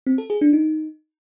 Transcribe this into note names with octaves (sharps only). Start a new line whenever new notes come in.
C4
A4
G#4
D4
D#4